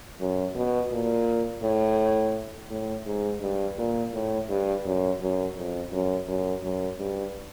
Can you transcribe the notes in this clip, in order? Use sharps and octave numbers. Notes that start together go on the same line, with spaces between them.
F#2
B2
A#2
A2
A2
G#2
G2
A#2
A2
G2
F#2
F#2
F2
F#2
F#2
F#2
G2